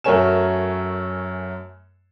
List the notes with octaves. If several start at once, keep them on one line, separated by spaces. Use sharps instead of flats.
F#2 A3 A#4 C#5 G#5 E7